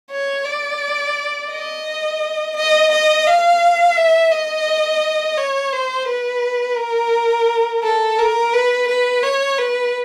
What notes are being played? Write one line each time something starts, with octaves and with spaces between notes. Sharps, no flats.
C#5
D5
D#5
D#5
D#5
F5
E5
D#5
C#5
C5
B4
A#4
A4
A#4
B4
B4
C#5
B4